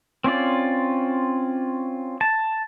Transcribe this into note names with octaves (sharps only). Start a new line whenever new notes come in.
C4 C#4 F4 D5
A5